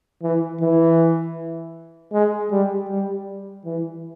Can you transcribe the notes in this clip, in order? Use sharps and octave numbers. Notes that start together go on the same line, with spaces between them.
E3
E3
G#3
G3
G3
E3